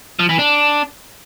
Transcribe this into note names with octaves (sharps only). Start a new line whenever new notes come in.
F3
E3
D4